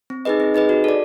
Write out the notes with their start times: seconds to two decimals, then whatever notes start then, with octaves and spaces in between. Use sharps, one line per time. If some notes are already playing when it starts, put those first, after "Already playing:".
0.10 C4
0.25 D#4 G#4 B4 D#5
0.40 C4
0.54 D#4 G#4 B4 D#5
0.69 F#4
0.84 A4 D5